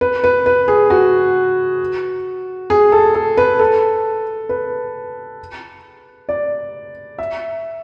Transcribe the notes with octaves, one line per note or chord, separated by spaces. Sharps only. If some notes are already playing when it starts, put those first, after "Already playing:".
B4
B4
B4
G#4
F#4
G#4
A4
A4
B4
A4
B4
D5
E5